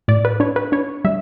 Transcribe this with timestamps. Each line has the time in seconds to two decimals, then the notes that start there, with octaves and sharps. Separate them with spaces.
0.08 A2 D5
0.25 B4
0.40 D4 C#5
0.56 B4
0.72 D4 C#5
1.04 G3 E5